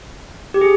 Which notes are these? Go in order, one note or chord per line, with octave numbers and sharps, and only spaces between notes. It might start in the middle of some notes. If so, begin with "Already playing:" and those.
G4
G#4